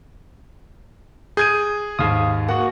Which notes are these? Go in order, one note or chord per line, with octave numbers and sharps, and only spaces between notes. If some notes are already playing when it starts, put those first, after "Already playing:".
G#4 G6 G#6 D#7
D#2 G#2 F5 D#6
A#3 F#4 F#5